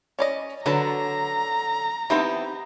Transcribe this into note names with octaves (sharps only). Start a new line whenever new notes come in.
C#4 D5 D#5
D3 F#3 F#4 B4 D5 A5 A#5
E3 B3 C4 D#4 G4